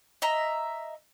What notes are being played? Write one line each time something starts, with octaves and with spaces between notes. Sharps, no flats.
D#5 E5 A#5